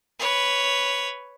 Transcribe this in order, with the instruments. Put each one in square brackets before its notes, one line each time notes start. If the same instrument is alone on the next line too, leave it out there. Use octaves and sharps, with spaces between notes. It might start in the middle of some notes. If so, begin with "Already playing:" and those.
[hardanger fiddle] B4 C#5